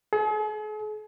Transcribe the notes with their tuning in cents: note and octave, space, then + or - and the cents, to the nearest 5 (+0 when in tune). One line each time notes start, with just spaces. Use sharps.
G#4 +45